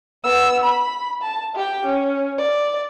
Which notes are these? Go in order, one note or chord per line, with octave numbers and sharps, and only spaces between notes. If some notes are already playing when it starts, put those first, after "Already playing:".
B3 E6
B5
A5
G4 G5
C#4
D5